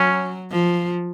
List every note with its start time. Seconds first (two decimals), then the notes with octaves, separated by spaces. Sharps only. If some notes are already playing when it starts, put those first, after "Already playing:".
Already playing: F#3 C#4
0.51 F3